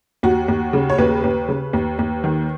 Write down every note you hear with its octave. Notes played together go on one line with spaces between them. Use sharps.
D#2 F#4
D#2
C#3
C#5
D#2 B4
D#2
C#3
D#2
D#2
D#3